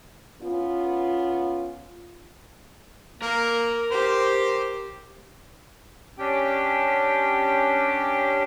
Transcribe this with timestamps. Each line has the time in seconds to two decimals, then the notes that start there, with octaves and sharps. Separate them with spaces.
0.42 B3 C#4 F4
3.22 A#3 A#4 A#5
3.91 G4 C5
6.19 C#4 D4 G4 G5